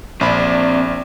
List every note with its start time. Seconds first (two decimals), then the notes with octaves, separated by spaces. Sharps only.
0.21 A#1 C4 D5 B5